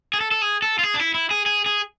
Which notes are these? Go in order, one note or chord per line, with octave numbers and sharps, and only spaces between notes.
G#4
A4
A4
G#4
A4
F4
G#4
D4
E4
E4
G#4
G#4
G#4